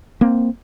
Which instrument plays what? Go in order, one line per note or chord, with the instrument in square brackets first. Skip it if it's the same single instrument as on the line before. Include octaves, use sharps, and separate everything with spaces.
[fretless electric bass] A#3 C4